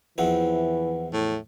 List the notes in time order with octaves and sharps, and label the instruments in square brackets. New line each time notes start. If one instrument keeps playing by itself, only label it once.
[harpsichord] E2 F3 C4 [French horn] E3 [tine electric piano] B4 F#5
[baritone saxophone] A2